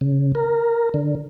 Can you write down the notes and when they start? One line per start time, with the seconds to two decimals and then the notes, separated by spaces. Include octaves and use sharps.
0.01 C#3
0.35 A#4
0.94 D3